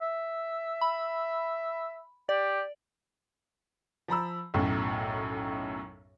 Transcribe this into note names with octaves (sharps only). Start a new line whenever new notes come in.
E5
B5
G4 D5
F3 A#5 B5 E6
B1 F#2 A2